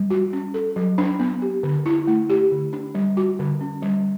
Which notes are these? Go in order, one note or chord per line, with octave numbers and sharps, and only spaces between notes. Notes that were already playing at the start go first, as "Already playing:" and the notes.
Already playing: G3
F#4
C#4
A4
F#3
D4
B3
G4
D3
E4
A3
G4
D3
D4
G3
F#4
D3
C#4
G3